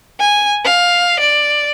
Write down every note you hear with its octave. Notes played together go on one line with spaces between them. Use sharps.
G#5
F5
D5